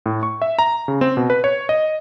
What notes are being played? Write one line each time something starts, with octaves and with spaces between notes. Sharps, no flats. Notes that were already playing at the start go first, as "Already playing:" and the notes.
A2
C#6
E5
A#5
C#3
C4
B2
B4
C#5
D#5